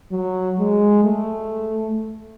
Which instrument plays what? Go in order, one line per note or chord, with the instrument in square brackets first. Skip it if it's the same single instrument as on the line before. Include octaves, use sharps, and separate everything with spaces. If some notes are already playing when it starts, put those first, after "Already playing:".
[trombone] F#3
G#3
A3